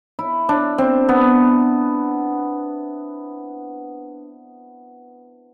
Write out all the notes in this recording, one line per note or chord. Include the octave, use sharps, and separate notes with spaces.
E4
D4
C4
B3